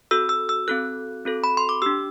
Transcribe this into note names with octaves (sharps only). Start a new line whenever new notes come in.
C4 F#4 A4 E6
E6
E6
C4 F#4 A4 F#6
C4 F#4 A4
B5
C6
D6
D4 G4 E6